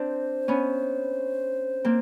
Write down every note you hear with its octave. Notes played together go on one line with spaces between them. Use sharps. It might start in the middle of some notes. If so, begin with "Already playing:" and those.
Already playing: C4 D4 C5
B3 C#4
A#3 C4